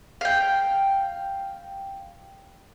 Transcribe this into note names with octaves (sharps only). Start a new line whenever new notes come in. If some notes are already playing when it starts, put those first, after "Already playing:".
F5 G5